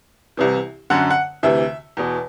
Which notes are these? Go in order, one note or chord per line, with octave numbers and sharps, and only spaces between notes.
C2 C3 E3
F#2 D3 F#5
F#5
D2 C3 E3 E5
E2 B2